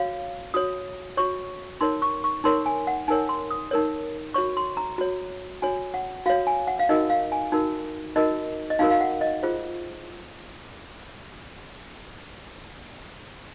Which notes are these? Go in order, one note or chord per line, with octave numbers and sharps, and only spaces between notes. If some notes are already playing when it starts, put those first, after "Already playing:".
Already playing: F#4 C#5 F5
F#4 C#5 D#6
F#4 C#5 C#6
D#4 A#4 C#5 C6
C#6
C#6
D#4 A#4 C#5 C6
G#5
F#5
D#4 A#4 C#5 G#5
C6
D#6
D#4 A#4 C#5
F#4 C#5 C#6
C6
A#5
F#4 C#5
F#4 C#5 G#5
F#5
F#4 C#5 F5
G#5
F#5
F5
D#4 F#4 A#4 D#5
F5
G#5
D#4 F#4 A#4
D#4 F#4 A#4 D#5
D#5
D#4 F#4 A#4 F5
F5
F#5
D#5
F4 G#4 C5